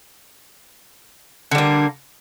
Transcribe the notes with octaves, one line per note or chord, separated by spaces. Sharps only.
D3 G3 A#3